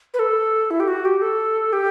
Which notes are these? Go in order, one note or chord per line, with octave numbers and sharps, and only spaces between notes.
B4
A4
E4
G4
F#4
G4
A4
G4